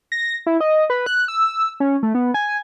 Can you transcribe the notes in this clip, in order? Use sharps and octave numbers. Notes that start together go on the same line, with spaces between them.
A#6
E4
D#5
B4
F#6
E6
C#4
A3
B3
G#5